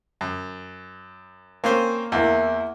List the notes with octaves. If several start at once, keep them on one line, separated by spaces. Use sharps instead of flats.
F#2
A#3 C4 C#4 C5
E2 A#3 E4 F#5